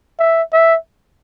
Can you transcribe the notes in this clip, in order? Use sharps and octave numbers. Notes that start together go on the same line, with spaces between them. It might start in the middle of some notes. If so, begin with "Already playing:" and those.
E5
E5